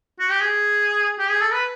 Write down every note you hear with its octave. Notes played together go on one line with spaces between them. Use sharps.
F#4
G4
G#4
G4
G#4
A4
B4